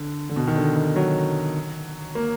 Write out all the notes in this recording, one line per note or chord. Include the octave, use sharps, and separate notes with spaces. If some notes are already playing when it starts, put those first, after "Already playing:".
Already playing: D3
D3
B2
D#3
D3
D#3
F#3
A#3